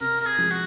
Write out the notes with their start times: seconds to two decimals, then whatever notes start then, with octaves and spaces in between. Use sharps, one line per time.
0.01 C3 A#4
0.20 A#4
0.26 G#4
0.38 F3 G#3
0.51 F#4